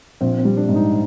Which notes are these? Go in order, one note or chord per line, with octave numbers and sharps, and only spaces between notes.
A#1 C4
C4
G3
D4
G#2
D#4